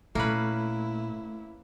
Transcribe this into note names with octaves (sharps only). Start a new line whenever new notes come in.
A#2 A3 A#3 C#4 E4 B4